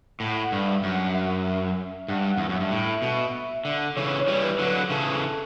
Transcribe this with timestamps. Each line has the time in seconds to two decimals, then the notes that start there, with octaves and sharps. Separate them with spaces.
0.20 A2 F#5
0.44 F#5
0.52 G2
0.67 E5
0.83 F#2
0.91 F#5
1.14 E5
2.08 G2 F#5
2.37 E2
2.49 F#2
2.55 G2 E5
2.71 A2
3.02 B2
3.65 D3
3.96 C#3 E3 C#5
4.20 C#5
4.28 E3 G3
4.43 B4
4.58 D3 F#3
4.66 B4
4.90 C#3 E3 A4